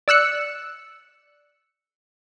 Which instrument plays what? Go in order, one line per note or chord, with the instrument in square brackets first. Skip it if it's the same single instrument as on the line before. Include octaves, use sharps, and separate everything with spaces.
[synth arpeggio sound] D5 E6 F#6 C#7